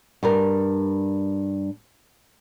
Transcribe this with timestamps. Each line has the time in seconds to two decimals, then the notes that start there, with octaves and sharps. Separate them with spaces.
0.23 G2 G3 A#4